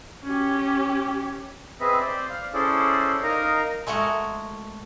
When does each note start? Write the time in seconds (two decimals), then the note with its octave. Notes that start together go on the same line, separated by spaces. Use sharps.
0.24 C#4 G4
1.80 C4 G#4 B4 D#5 E5
2.00 C5 D5
2.30 F5
2.54 C#4 E4 G#4 A4 C5 D5
3.23 D#4 A#4 D#5 F5 A#5
3.87 G#3 A3 F#4 A#4 D#5